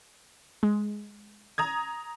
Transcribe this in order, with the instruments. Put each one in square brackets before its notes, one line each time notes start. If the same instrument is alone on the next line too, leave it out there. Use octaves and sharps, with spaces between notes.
[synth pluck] G#3
[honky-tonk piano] A#5 D#6 G#6